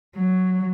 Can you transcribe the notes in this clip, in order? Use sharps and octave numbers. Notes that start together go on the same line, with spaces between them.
F#3